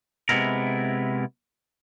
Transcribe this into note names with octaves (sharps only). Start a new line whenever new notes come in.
C3 G#3 B3 E4 A#4